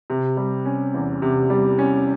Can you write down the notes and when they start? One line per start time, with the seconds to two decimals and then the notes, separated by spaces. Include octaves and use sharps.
0.10 C3
0.37 G3
0.66 C#4
0.94 E2
1.22 C3
1.50 G3
1.78 C#4